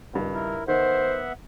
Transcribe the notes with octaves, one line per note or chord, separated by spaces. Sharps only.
C#2 G2 D#3
E4 A#4
D#3 B3 C5 E5 F#5